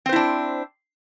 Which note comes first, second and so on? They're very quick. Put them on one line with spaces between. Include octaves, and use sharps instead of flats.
C4 C5 E4 D4